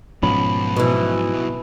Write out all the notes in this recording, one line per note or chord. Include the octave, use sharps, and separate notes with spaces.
B1 G#2 F3 B3 C#4 B5
B2 E3